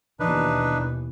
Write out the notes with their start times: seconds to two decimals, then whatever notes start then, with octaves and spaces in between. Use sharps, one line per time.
0.20 D#2 B2 E3 D4 D#4 B4